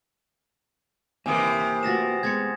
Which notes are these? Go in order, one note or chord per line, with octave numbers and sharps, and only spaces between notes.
C3 E3 A#3 D#4 G4 A#4 G#5 D#6
A3 F4 F#4 A6 A#6 E7
G#3 B3 G#4 G#6 A6 C#7